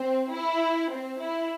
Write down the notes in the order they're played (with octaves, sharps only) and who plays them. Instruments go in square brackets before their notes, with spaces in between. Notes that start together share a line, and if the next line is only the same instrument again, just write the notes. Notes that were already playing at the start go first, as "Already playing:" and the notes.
Already playing: [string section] C4
E4
C4
E4